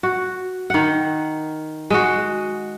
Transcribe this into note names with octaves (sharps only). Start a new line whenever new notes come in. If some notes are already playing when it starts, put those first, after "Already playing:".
F#4
D#3 F#5
G#3 F#4